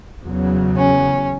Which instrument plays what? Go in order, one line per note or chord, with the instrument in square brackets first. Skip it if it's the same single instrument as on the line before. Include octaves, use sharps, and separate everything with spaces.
[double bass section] E2 C#3 F#3
[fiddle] C#4